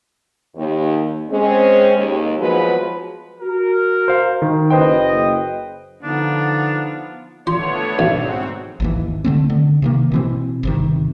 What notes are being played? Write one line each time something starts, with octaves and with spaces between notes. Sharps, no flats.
D#2
G#3 C4 C#4
D#2
F3 F#3 G#3 B3 F4 B4
F#4 A#4
C5 F5
D#3
F#1 B4 C5 D#5 G5
D3 F3 B3 D4 D#4 F4
A#2 D3 A3 B3 D4 F4 C#5 C6
B1 G#2 C4 F#4
G#1 D#2 E3
D3 A3 C4
D3
C3 D#3 A#3
B2 E3 C4
G1 C3 D#3